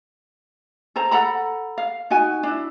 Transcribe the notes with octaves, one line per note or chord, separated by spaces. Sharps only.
A4 C5 A#5
A4 F#5 A#5 B5
F5
D#4 F#4 G#5
D4 E4